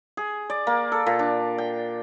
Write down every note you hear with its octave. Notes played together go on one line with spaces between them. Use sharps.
G#4
D5
A#3
A4
A#2
D4
G5